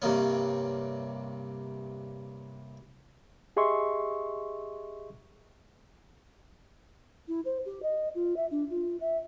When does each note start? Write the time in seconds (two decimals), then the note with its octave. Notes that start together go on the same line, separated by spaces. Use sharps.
0.02 G2 C3 A#3 C#4
3.57 G4 G#4 D#5 E5 C6 C#6
7.28 E4
7.45 C5
7.65 G4
7.82 D#5
8.15 F4
8.36 E5
8.51 D4
8.70 F4
9.00 E5